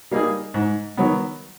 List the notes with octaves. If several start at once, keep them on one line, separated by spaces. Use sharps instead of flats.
G3 A#3 D#4 G#4
G#2
D#3 F#3 B3